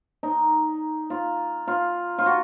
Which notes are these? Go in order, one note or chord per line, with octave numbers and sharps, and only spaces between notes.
D#4
F4
F4
F4
F#4